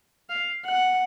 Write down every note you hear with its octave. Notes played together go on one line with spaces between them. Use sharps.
F5
F#5